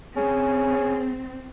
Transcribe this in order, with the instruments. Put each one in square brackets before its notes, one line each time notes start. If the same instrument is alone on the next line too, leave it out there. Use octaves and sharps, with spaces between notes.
[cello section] C4 [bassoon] C#4 [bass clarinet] G#4